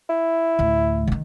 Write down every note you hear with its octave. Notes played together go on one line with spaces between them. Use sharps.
E4
D2 A2
D3 D#3